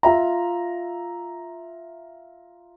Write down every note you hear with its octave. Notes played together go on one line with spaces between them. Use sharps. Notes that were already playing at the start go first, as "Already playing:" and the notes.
F4 E5 A#5